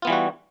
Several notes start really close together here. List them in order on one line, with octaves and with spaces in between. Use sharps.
F4 B3 E3 G3 F#4